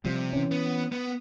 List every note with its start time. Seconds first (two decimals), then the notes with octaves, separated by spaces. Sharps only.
0.05 C3 F3 G3
0.33 E3 C#4
0.51 B3
0.92 B3